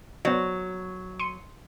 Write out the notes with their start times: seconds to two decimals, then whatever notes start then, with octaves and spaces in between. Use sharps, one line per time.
0.25 F#3 B3 C5 D5
1.19 C6 C#7 D#7